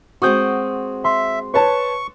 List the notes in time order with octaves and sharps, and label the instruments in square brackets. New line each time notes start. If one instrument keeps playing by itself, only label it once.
[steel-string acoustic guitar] G#3 C4 F#4 [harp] C#6 D#6 G6
[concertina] E5 [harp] C6
[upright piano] B4 C#5 A5 [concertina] C#6